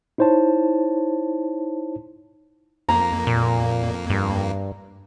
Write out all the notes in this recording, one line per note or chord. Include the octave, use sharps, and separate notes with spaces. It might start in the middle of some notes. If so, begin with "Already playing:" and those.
D#4 E4 C5 C#5 A5
F2 A#3 A#5
A#2
G2